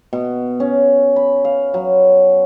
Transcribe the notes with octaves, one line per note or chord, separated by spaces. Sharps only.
B2
C#4
B5
F5
F#3